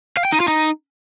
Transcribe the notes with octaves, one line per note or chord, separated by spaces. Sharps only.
F5
G5
D#4
F4
D#4